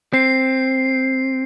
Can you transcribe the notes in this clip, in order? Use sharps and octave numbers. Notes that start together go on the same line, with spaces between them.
C4 C7